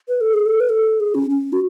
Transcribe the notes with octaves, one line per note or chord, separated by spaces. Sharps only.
B4
A4
G#4
A4
B4
A4
G#4
C#4
C#4
F#4